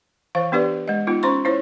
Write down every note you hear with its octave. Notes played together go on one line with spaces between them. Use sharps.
E3 C5 F5
B3 D4 G4 B4 D5
G#3 D#5
B3 D#4 F4
C#4 C5 C6 C#6
E4 C5 C#5